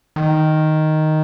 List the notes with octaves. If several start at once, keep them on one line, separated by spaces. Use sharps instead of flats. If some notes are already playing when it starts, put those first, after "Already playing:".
D#3